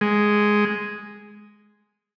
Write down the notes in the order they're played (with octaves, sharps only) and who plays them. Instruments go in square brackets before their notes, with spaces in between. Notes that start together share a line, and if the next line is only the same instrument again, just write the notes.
[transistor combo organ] G#3